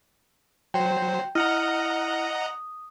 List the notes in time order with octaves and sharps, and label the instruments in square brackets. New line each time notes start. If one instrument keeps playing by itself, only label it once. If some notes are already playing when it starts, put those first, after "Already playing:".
[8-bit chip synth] F#3 C5 [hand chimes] G5
[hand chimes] E4 F6 [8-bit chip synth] D#5 F#5 A#5
[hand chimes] D#6